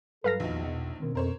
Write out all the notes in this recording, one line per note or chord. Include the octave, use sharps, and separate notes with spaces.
G2 F#3 A4 B4 F5 A#6
A#1 E2 D#3 F3 D#4 F#4
B2 D#5 F#5
B2 D#3 C4 C#4
F2 A#4 C5 C#5